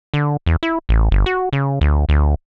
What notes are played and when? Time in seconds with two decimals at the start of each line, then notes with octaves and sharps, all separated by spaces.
0.14 D3
0.46 E2
0.63 E4
0.89 A1
1.11 G1
1.26 F#4
1.53 C#3
1.81 D2
2.09 D2